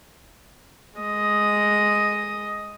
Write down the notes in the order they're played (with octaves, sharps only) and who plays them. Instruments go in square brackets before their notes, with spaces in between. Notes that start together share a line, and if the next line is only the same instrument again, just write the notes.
[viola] G#3 D#5